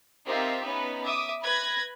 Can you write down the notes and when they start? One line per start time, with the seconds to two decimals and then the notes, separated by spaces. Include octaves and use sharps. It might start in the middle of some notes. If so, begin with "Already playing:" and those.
0.25 C4 D#4 F4 G4 A#4 E5
0.63 B3 C#4 D#4 B4
1.04 E5 D6 D#6
1.42 B4 B5 F#6 G#6 A#6